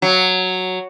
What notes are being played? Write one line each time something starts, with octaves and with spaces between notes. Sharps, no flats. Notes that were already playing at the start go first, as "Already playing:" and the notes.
F#3